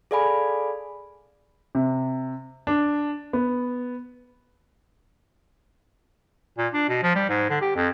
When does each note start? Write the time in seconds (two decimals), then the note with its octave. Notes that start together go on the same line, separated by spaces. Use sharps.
0.11 G#4 A4 D5 F5 G#5 B5
1.75 C3
2.67 D4
3.33 B3
6.58 A#2
6.74 D4
6.89 B2
7.03 F3
7.15 G3
7.29 G#2
7.50 D3
7.61 G4
7.76 F2